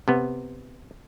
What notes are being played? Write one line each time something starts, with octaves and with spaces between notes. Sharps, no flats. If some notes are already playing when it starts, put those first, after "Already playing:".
C3 B3